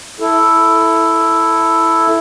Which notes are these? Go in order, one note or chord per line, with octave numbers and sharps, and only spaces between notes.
E4 A4